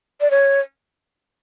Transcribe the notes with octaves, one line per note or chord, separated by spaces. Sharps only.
D5
C#5